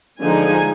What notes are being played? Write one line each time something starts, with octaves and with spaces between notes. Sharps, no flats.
D3 F3 G#3 D#4 G#5